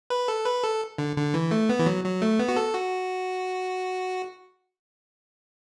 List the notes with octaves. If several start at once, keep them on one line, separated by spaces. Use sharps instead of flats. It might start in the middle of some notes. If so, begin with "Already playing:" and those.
B4
A4
B4
A4
D3
D3
E3
A3
B3
E3
F#3
F#3
A3
B3
F#4
A4
F#4